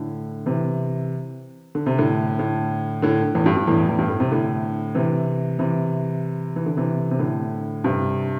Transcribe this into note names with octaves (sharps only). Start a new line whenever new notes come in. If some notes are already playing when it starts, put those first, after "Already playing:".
Already playing: A2 D3
C3 E3
D3
C3
A2 D3
A2 D3
A2 D3
E2 A2
G2
G2
E2 A2
E2
G2
A2
C3
A2 D3
C3 E3
C3 E3
E3
D3
C3 E3
C3
A2 D3
G2 C3